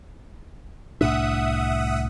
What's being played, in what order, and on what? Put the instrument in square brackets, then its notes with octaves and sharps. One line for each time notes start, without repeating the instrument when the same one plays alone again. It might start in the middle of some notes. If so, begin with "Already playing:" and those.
[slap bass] C2 A2 D4 [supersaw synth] E5 F#5 D#6